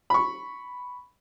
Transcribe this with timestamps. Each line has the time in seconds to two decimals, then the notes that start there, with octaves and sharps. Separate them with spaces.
0.10 B5 C#6